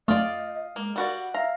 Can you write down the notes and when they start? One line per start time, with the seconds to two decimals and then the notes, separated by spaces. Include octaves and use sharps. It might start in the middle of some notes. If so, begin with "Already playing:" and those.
0.08 F#2 A3 F4 D5 D#5 F5 D#6
0.76 G#3 A#3
0.96 G3 F#4 A#4 D5
1.13 F#5
1.34 E5 F5 A#5